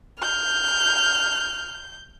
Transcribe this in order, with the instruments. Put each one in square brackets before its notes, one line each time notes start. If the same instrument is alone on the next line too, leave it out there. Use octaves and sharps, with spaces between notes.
[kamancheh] F6 [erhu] G6